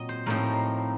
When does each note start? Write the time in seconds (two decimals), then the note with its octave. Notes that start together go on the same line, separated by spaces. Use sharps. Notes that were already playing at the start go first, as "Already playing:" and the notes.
Already playing: A#2 F#3 C4 D#5
0.09 C5
0.26 A2 F3 C4 D#4 A#4